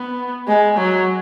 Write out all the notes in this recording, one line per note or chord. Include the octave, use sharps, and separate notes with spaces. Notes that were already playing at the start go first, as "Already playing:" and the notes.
Already playing: B3
G#3
F#3